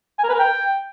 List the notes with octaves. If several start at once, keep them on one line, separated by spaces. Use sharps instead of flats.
G#5
A#4
B4
A#4
G5